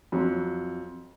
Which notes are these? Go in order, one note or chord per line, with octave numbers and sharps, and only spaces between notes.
F2 F#3